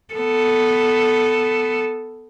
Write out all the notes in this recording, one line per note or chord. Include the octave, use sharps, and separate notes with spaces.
B3 A4